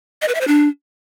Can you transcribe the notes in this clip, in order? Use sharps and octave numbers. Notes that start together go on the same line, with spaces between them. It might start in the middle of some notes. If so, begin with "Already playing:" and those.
D#5
B4
E5
C5
D4